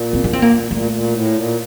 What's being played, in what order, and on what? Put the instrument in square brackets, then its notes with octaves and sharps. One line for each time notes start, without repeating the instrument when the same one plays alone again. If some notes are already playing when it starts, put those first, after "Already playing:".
Already playing: [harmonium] A#2
[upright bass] C4
D4
C4
A#3
[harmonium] A#2 [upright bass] A3
[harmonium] A#2
A2
A#2